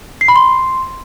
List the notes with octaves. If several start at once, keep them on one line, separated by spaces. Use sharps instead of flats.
C7
B5
C6